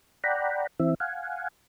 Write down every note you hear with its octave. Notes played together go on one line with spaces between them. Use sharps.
D5 F#5 G5 A#5 B5
E3 C4 E5
F5 F#5 G#5